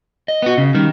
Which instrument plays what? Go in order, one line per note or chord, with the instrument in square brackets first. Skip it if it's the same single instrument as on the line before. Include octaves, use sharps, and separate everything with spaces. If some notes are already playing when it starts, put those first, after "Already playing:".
[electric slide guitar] D#5
[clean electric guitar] B3 F#4
C#3
[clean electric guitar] D#3 [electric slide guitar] G3